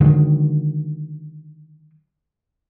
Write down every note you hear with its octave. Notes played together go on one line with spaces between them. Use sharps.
D3 D#3 F#3 G#3